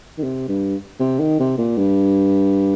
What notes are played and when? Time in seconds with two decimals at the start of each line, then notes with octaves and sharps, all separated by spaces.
0.18 D#3
0.23 C3
0.48 G2
1.00 C3
1.20 D#3
1.39 C3
1.58 A#2
1.77 G2